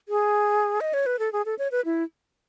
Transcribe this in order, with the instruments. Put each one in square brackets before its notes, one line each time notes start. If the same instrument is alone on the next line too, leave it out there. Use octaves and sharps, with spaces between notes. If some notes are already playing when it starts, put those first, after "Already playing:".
[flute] G#4
D#5
C#5
B4
A4
G#4
A4
C#5
B4
E4